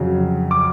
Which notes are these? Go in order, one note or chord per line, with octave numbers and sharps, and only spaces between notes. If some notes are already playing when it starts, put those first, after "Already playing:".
Already playing: F2 C#3 F#3
D6